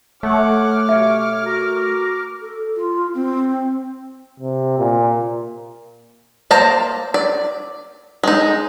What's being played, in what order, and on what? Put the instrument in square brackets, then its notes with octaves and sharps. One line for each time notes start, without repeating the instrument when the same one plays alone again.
[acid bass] A3 [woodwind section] C#5 F#5 [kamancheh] D6 F6
[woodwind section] B2 G4 C#5 [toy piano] E5
[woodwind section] F#4 A#4
[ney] A4
F4
C4
[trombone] C3
A#2
[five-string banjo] A#3 C5 A5 A#5
D5
G#3 D#4